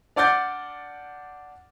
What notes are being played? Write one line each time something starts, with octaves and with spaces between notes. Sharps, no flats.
D4 D5 F#5 D6 G6 A6